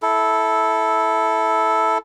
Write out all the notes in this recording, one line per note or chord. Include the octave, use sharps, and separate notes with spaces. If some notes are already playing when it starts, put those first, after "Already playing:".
E4 A4